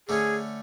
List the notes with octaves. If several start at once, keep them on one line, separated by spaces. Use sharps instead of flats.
D3 A3 C#4 G#4